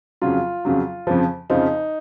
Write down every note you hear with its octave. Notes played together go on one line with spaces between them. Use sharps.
F2 C#3 F#3 F4
F2 C#3 F#3
F2 C#3 F3
F2 C#3 F3 D#4